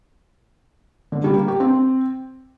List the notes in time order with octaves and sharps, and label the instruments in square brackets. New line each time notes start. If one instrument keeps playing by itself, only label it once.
[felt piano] D3
G3
A#3
G4
C4